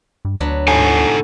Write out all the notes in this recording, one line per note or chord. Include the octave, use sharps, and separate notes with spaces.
G2
D2 F#3 B3 D4
G#2 B2 A4 F#5 G#5